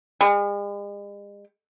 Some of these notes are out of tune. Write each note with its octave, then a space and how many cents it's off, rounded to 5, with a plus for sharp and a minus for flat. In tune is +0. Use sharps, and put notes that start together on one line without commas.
G#3 -45